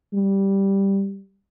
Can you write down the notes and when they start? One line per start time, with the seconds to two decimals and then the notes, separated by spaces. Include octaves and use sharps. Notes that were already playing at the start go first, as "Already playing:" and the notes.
0.13 G3